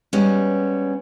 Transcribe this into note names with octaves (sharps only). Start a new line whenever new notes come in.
G3 G#3 B3 C#4